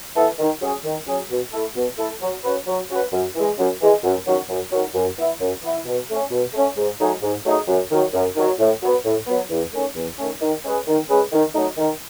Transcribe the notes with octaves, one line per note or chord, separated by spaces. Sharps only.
E3 B3 E4 A4
D#3
F#3 C#4 G#4
D#3
F#3 C#4 G#4
B2
A3 E4 A4
B2
A3 E4 A4
F#3
C#4 F#4 B4
F#3
C#4 F#4 B4
F#2
E3 G#3
F#2
E3 G#3
F#2
D#3 F#3 C#4 F#4
F#2
D#3 F#3 C#4 F#4
F#2
E3 B3 E4
F#2
E3 B3 E4
B2
A3 C#4
B2
A3 C#4
G#2
F#3 A3 D#4 G#4
G#2
F#3 A3 D#4 G#4
F#2
D#3 F#3
F#2
D#3 F#3
A2
F#3 B3
A2
F#3 B3
E2
D#3 A3 C#4
E2
D#3 A3 C#4
D#3
G#3 C#4 G#4 B4
D#3
G#3 C#4 G#4 B4
D#3
F#3 A3 D#4
D#3